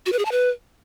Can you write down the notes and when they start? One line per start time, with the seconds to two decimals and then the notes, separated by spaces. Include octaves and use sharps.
0.06 F#4
0.13 B4
0.19 G#4
0.25 A5
0.32 B4